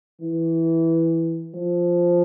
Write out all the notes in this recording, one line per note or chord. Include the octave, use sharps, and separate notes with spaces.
E3
F3